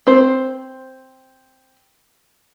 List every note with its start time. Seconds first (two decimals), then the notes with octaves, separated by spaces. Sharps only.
0.07 C4 C5